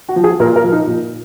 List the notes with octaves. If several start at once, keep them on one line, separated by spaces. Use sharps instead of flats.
F#4
F3
G#4
A#2 A#4
A#4
F3
D#4
A#2